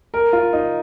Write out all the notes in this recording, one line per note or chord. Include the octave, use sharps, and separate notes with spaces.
A#4
F4
D#4